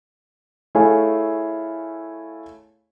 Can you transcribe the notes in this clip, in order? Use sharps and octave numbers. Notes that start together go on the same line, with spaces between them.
A3 E4 G#4 C#5 F5 G#5